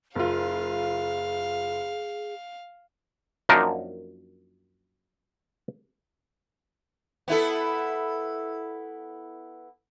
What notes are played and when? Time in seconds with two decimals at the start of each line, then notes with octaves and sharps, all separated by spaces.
0.15 F#1 F4 G#4 F5
3.49 F#2 F3 A#3 D4 D#4 A#4
7.28 B3 E4 A4